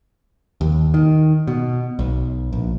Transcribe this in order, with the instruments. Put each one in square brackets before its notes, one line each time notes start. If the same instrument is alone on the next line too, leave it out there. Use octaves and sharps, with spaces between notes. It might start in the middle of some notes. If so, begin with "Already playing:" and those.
[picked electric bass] D#2
D#3
B2
B1
A#1